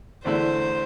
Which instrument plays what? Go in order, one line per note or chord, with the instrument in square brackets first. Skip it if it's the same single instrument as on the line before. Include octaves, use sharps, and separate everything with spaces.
[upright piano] E2 D3 A3 E4 [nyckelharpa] C5